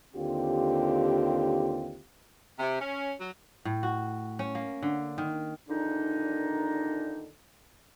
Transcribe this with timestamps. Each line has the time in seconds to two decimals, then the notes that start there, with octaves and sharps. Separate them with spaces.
0.15 D#2 D3 C4 F4 G4
2.59 C3
2.80 C#4
3.19 F#3
3.65 A2
3.83 F#4
4.39 C#4
4.55 A#3
4.83 D3
5.18 D#3
5.69 E2 A#2 D3 D#3 D4 D#4